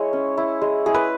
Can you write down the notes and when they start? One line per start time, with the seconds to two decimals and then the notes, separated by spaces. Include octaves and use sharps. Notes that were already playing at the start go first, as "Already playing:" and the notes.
Already playing: G#3 E4 C#5
0.13 C#4
0.37 E4
0.61 G#3
0.86 E4 G#4
0.94 B4